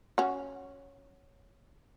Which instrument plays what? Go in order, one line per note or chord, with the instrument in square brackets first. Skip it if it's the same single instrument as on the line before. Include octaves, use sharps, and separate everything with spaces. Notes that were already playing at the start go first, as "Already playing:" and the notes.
[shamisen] C#4 F#4